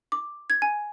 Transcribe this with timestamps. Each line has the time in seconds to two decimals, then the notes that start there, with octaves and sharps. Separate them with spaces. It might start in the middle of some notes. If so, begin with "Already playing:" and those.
0.12 D6
0.50 G#6
0.62 G#5